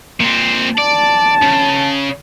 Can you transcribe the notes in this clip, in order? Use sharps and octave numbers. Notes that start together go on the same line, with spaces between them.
A#2 C4
D5 A5
C#3